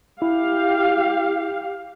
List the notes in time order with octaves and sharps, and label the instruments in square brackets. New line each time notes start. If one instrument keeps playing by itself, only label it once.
[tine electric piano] E4 [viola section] G4 F5